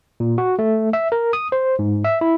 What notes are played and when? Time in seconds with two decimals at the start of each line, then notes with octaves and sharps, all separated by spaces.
0.20 A#2
0.38 F#4
0.59 A3
0.93 E5
1.12 A#4
1.33 D#6
1.52 C5
1.79 G#2
2.05 E5
2.21 E4